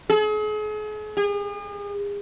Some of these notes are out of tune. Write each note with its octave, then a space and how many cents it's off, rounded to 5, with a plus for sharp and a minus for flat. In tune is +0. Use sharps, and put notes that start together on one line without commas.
G#4 +40
G#4 -40